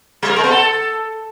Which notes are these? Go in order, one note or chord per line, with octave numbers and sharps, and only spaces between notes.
G3
A#4
G#3
B3
A4